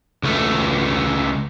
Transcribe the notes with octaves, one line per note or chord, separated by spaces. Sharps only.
C#2 A3